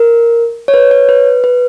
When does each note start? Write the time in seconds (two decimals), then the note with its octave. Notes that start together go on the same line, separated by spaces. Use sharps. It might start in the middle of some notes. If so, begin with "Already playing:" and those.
Already playing: A#4
0.68 C#5
0.74 B4
0.91 C#5
1.09 B4
1.44 B4